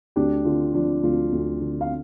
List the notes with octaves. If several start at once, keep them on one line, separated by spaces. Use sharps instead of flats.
D2 D4 G4
D3 F4
F3 D4
D2 F4
D2
D3
F5